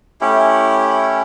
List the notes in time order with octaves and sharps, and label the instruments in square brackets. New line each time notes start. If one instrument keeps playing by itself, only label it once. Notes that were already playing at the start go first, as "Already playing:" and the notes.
[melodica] A3 C#4 E4 G4